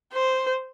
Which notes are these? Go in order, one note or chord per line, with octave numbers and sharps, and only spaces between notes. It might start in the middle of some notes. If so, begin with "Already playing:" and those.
C5